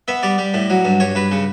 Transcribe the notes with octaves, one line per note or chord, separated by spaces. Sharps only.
B3 E5
G3 D5
G3
A2
F#3
G2
G2 C#5
G2 B4
C#3